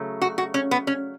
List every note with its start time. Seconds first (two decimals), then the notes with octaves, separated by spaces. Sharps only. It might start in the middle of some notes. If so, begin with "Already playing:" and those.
Already playing: C#3 F#3 A3
0.22 F#4
0.38 F#4
0.54 C#4
0.71 B3
0.87 C#4